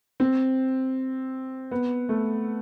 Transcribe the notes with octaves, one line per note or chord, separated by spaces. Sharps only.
C4
B3
A3